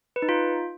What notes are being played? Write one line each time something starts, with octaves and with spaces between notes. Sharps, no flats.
B4
D#4
F4